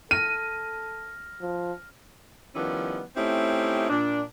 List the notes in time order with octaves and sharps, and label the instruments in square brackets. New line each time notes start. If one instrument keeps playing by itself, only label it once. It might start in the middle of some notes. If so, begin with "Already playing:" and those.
[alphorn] A4 [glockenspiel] F6 A#6 [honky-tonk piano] D#7
[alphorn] F3
[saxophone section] D#3 F3 G3 B3 C#4 E4
A3 C4 C#4 D#4 E4 G4
A#2 D4